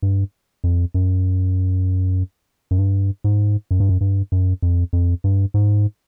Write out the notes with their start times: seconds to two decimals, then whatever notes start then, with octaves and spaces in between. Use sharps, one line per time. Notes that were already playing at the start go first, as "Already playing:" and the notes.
0.02 G2
0.64 F2
0.94 F#2
2.71 F#2
2.79 G2
3.24 G#2
3.71 F#2
3.80 G2
3.89 F#2
4.01 G2
4.32 F#2
4.62 F2
4.93 F2
5.24 G2
5.54 G#2